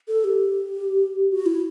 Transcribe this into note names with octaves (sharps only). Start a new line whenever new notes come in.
A4
G4
F#4
E4